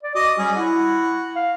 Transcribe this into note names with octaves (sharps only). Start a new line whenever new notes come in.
D5
F#4 D#5 D6
G3 C#4 G#4
E4 F#4
F5